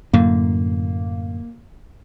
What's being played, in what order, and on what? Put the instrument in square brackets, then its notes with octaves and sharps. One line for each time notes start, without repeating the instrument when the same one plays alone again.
[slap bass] F#2 A2 D3 [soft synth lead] A#3